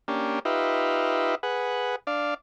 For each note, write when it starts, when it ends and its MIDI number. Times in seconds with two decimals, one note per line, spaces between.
0.08 0.39 58
0.08 0.39 61
0.08 0.39 62
0.08 0.39 67
0.45 1.35 63
0.45 1.35 65
0.45 1.35 67
0.45 1.35 71
0.45 1.35 76
1.43 1.96 68
1.43 1.96 71
1.43 1.96 78
2.07 2.34 62
2.07 2.34 74
2.07 2.34 77